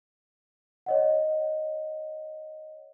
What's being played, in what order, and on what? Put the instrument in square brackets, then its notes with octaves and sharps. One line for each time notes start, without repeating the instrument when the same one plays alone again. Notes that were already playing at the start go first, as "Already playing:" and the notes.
[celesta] C#5 D#5 F#5